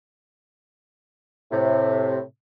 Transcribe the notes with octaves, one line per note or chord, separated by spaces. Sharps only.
A2 C3